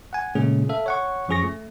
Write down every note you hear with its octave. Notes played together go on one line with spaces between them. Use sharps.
F#5 G#5
A#2 C#3 G#3 A3 C#4 G#4
A4 E5 F5
C#5 F#5 C#6
F#2 F3 C#4 G#4 C#6 A#6
A3